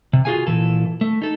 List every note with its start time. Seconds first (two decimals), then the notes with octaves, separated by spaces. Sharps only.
0.13 C3
0.25 F4 F#4 G#4 F5 G#5
0.47 A#2 E3 A4
1.01 A3
1.22 D#4 A4